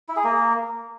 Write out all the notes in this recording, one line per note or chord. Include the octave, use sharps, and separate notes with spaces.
E4
G#4
A#3